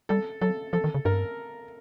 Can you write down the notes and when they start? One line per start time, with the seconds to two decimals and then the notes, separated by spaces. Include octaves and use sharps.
0.09 G3 A4
0.41 F#3 A4
0.73 F3 A4
0.84 D#3
0.94 C#3
1.05 G2 A#4